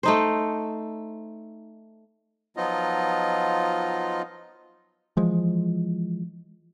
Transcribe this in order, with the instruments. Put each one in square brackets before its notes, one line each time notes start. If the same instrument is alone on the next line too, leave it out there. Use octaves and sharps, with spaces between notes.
[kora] A3 D#4 C5
[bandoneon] F3 F#3 B3 D#4 F4 D#5
[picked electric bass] E3 F3 G#3